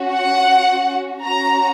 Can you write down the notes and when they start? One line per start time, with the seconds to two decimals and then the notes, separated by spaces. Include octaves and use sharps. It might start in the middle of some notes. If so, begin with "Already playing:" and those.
Already playing: C#4 F#4
0.13 F#5
1.25 C#4 F#4 A#5